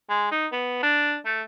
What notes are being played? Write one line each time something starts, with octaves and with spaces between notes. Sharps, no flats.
G#3
D#4
B3
D4
A3